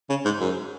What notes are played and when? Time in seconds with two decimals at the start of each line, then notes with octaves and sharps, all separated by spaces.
0.09 C#3
0.25 G#2
0.40 F#2